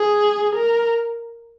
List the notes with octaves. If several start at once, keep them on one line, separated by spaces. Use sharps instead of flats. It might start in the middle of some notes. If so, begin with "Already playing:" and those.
Already playing: G#4
A#4